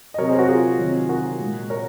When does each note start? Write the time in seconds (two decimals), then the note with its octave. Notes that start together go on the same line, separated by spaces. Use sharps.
0.14 D#5
0.18 C3 F#3 A#4 C#5
0.28 G#4 C5
0.38 F#4 A#4
0.48 F4 G#4
0.78 C3 D#3 F#3
1.09 F#4 A#4
1.39 A#2 G#3
1.70 A#4 C#5